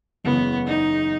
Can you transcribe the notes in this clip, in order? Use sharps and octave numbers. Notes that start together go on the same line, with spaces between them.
F#1 E2 C#3 G#3 B3
D#4